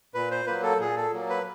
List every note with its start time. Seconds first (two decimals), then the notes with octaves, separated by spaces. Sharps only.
0.14 A#2 B4
0.31 C5
0.47 F#3 A#3 B4
0.63 A4
0.80 A#2 G#4
0.97 A4
1.13 F#3 A#3
1.29 B4